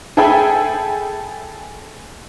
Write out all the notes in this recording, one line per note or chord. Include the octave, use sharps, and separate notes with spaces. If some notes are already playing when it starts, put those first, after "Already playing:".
G#4 A4 E5 G5 G#5 B5